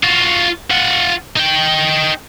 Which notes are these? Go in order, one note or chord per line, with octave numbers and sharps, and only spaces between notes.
F4 F#4
F4 F#5
D#4 G5